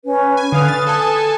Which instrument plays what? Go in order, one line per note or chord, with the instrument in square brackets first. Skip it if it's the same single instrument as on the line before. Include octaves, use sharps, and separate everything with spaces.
[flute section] C#4 B4
[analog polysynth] G#5
[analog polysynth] D3 F5 G#5 [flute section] B4 D#6
[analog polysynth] A6
A4 G#5 A5